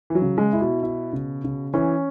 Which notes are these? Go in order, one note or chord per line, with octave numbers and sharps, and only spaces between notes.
E3
F#3
C#3
G#3
E4
B2
E4
C#3
C#3
E3 C#4